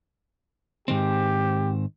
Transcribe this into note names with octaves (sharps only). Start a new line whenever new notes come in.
G#2 D#3 C4 G4